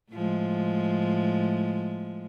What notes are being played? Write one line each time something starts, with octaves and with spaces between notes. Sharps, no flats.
A2 F3 G#3